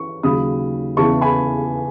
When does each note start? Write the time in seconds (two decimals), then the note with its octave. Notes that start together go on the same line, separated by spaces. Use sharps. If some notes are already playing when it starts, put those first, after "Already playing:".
Already playing: E3 C#6
0.23 D#2 C#3 F#3 B5 D#6
0.97 E2 C#3 E3 A5 C#6
1.21 G#5 B5